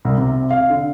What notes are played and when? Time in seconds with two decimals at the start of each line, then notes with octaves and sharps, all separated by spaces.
0.05 C2
0.18 C3
0.51 F5
0.70 D3